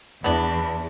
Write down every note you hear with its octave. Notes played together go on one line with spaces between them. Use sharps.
E2 B3 D4